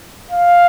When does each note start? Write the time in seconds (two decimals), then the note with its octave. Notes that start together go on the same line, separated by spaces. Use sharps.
0.31 F5